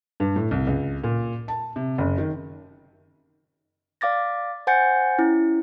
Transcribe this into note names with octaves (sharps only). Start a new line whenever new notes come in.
G2
A2
C2
C#2
A#2
A5
C3
F#1
D#3
D5 F5 D6 A6 A#6
C5 F#5 G#5 G6 A6 C#7
C#4 E4